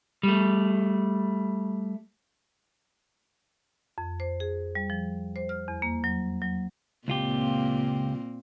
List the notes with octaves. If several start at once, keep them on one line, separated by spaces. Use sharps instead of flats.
G3 A3
F2
C5
G#4
G3
F3
C5
F6
E2
A#3
F#3
F#3
C#2 A#2 A#3 C4 F4 G4